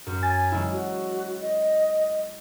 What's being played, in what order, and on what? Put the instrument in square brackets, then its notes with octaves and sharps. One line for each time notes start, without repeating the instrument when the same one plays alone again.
[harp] F#2
[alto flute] G#5 [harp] A6
[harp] F#3 G#3 E4
[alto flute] F#4
D#5